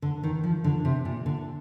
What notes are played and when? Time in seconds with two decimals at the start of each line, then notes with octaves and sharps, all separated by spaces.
0.02 D3
0.23 D#3
0.44 F3
0.64 D3
0.85 C3
1.05 A#2
1.26 D3